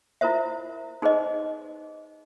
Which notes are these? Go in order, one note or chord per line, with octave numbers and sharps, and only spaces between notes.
E4 F4 A#4 C5 E5
D#4 G#4 B4 C5 D#5